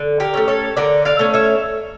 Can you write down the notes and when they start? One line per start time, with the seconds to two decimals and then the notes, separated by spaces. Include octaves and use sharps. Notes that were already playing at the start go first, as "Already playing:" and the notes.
Already playing: D3
0.20 G4 A#4
0.34 A3 C#4
0.48 A4 C#5
0.76 D3 A#4 D5
1.05 D5 F5
1.19 A3 C#4
1.34 C#5 E5